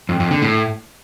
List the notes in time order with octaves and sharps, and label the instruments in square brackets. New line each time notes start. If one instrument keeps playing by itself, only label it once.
[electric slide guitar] F2
F2
D3
A2